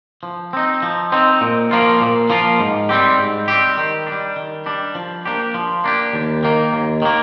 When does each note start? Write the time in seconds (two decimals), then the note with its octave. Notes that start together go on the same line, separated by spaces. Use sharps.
0.23 F3
0.53 C4 D#4
0.83 F3
1.12 C4 D#4
1.41 A#2
1.71 F3 A#3 F4
2.01 A#2
2.30 F3 A#3 F4
2.60 G#2
2.89 G3 C4 G4
3.18 G#2
3.48 G3 C4 G4
3.77 D#3
4.07 D4
4.12 G3
4.36 D#3
4.66 G3 D4
4.95 F3
5.25 A#3 D4 G4
5.54 F3
5.84 A#3 D4 G4
6.13 D#2
6.43 D#3 A#3
6.73 D#2
7.02 D#3 A#3